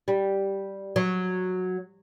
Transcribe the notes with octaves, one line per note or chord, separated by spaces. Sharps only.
G3
F#3